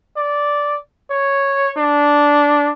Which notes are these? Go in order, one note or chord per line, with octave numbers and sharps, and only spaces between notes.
D5
C#5
D4